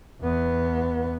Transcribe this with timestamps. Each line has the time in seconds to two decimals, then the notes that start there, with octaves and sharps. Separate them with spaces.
0.21 E2 B3